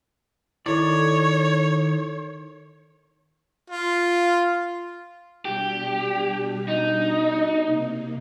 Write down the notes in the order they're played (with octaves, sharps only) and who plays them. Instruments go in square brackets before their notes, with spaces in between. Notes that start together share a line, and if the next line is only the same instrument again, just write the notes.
[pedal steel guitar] D#3 D5 [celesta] E4 A4 [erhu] C#5
[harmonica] F4
[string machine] B2 G3 D4 [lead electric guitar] G4
[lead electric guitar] D#4
[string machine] C3 A#3